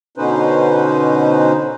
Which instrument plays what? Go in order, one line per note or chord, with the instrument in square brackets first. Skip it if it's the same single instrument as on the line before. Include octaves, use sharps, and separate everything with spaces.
[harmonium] B2 D3 C#4 D#4 B4 C5